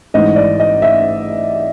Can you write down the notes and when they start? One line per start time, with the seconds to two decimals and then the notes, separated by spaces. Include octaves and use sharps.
0.14 A1 G#2 E3 D#5
0.36 D5
0.60 D#5
0.82 E5